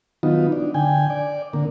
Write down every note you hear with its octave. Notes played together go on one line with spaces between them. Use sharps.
D#3 F#3 B3 D#4 F4
D4
D3 G5 G#5
D5
D3 A#3